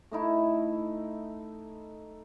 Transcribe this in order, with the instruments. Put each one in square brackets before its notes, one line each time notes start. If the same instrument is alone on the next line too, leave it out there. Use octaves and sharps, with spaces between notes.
[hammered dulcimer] A3 D#4 E4